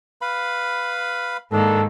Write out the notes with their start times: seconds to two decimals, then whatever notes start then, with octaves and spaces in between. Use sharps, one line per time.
0.21 B4 F5 B5
1.52 G#2 D#3 A#3 D4 A4